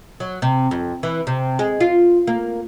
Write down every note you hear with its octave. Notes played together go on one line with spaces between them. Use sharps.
F#3
C3
F2
E3
C3
G#3
F4
A#3